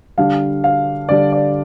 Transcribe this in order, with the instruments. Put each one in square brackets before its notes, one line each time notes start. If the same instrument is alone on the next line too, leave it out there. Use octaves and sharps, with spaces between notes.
[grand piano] D3 G3 D4 F5
F5
D3 G3 D4 D5
D5